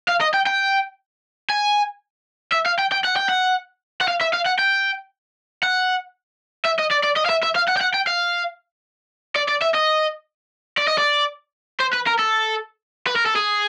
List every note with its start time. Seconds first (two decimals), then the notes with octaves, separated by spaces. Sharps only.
0.08 F5
0.21 D#5
0.34 G5
0.47 G5
1.50 G#5
2.52 E5
2.66 F5
2.79 G5
2.92 G5
3.04 F#5
3.16 G5
3.29 F#5
4.01 F#5
4.08 F5
4.21 E5
4.33 F5
4.46 F#5
4.59 G5
5.63 F#5
6.65 E5
6.79 D#5
6.91 D5
7.03 D5
7.16 D#5
7.25 F5
7.29 E5
7.43 E5
7.55 F5
7.68 F#5
7.77 G5
7.81 F#5
7.94 G5
8.07 F5
9.36 D5
9.49 D5
9.62 E5
9.74 D#5
10.77 D5
10.87 D#5
10.98 D5
11.80 C5
11.93 B4
12.07 A#4
12.19 A4
13.07 B4
13.16 A#4
13.26 A4
13.36 G#4